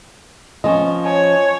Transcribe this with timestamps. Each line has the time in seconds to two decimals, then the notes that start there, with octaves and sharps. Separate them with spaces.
0.64 F3 C#4 D#5 C6 C#6
1.05 C#5 G#5 A5